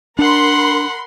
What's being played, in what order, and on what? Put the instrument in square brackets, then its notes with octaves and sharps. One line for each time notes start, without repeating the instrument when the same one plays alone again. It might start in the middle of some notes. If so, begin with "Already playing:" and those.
[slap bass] D4 [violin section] A#4 B5 C6 [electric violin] F#5